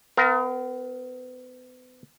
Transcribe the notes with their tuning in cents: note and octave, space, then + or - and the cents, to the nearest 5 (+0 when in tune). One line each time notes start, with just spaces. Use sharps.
B3 +40 A#4 +0 F5 +0